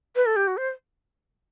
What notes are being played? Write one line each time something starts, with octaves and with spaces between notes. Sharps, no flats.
B4
A4
G4
F#4
C5